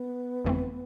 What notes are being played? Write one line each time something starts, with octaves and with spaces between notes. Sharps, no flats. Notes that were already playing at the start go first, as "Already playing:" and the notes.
Already playing: B3
G1 F2 E3 A3 C4